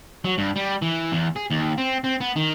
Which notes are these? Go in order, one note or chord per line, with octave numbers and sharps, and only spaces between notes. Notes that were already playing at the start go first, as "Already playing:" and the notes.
F#3
G2
G3
E3
E2
G#4
D#2
C4
C4
B3
D#3